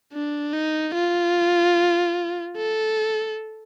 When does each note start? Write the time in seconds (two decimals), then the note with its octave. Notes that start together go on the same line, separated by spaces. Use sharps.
0.13 D4
0.53 D#4
0.94 F4
2.57 A4